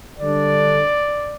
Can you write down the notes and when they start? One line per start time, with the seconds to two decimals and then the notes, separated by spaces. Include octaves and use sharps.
0.19 D3 G3 D4 D5